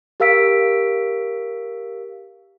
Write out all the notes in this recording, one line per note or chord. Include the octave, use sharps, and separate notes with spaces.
G4 A#4 F5 E6 B6 D7